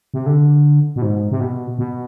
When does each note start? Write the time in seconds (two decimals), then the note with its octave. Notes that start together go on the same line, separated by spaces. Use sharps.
0.14 C3
0.26 D3
0.96 B2
1.02 G#2
1.31 C3
1.40 B2
1.79 B2